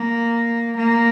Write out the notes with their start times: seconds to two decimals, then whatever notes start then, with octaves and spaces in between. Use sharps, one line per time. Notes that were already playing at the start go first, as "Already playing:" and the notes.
Already playing: A#3
0.77 A#3